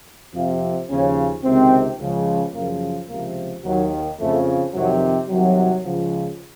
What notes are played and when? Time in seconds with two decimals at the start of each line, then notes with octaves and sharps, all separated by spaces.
0.35 F2 C3 F3 F4
0.89 D#2 C#3 F3 C#4
1.44 C#2 C3 D#3 C4
2.00 C#2 C#3 F3
2.54 F#2 C#3 F3 A#3
3.09 C#2 C3 F3 A#3
3.64 D#2 D#3 F#3
4.20 F2 C#3 F3 A3
4.74 F2 C3 D#3 F#3
5.29 C2 C3 D#3 F#3
5.84 C#2 C#3 F3